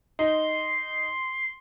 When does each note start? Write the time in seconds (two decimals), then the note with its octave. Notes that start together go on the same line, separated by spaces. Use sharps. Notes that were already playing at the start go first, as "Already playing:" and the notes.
0.19 D#4 C6